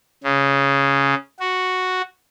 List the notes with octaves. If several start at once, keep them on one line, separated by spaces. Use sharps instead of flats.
C#3
F#4